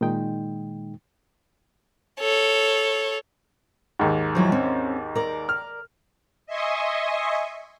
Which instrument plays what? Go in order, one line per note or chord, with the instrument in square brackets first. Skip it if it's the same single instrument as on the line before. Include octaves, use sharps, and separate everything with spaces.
[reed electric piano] A#2 D#3 G#3 D#4 G5
[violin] A4 C#5
[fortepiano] D#2 G#2
[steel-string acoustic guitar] F3 F#3 E4
C4 C#4
A#4 D5
[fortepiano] F6
[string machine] D#5 E5 G#5 C6 C#6 D#6